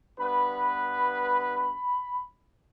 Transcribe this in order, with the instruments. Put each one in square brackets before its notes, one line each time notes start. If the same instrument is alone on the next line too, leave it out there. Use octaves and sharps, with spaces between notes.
[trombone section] G2 B3 B4 [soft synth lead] B5